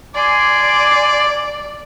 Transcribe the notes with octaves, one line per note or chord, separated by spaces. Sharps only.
D5 G#5 C6 D6